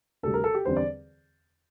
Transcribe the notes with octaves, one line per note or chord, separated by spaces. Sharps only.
D2 C3 G3 A4
A#4
A4
G4
E2 D3 G3 C4 C5
D5